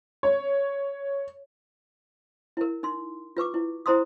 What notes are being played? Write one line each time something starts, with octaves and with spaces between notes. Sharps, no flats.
C#5
E4 A#4
D#4 C6
F4 B4 C#6 D6
E4
E4 C5 A#5 C6 D#6